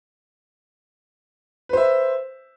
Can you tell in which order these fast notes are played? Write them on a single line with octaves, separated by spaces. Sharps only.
B4 C5 E5